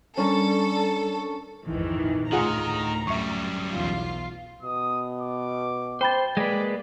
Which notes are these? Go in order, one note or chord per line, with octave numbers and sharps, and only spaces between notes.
G3 C#4 D4 A4 A#4
A#1 F2 G#2 D#3 E3
D2 A2 D#3 F4 G#4 F#5 A#5
F#2 G3 E5 C#6
B1 E2 F4
B2 D#6
D6
C5 G5 B5 A6
G#3 A#3 B4 D5